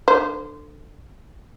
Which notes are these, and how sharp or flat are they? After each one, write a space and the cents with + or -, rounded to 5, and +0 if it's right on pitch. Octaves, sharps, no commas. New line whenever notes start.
D3 +20 C5 -20